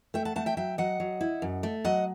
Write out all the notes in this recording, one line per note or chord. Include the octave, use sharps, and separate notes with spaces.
A3 E5 G5
F#5 A5
A3 F#5 A5
E5 G5
F#3 E5 G5
F#3 D#5 F#5
F#3
E4
F#2
A3
F#3 D#5 F#5